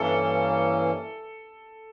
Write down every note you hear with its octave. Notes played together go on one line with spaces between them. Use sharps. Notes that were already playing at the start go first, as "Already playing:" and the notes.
Already playing: G2 E3 A#3 C#4 A4